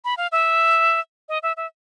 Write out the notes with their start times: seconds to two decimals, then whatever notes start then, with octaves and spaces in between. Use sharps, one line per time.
0.05 B5
0.17 F5
0.32 E5
1.29 D#5
1.43 E5
1.57 E5